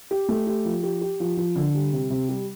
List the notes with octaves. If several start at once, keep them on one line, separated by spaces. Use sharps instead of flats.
G4
A3
G4
F3
G4
G4
F3
F3
D3
G3
C3
C3
G3